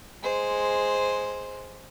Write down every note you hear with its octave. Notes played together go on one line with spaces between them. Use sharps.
G#3 C5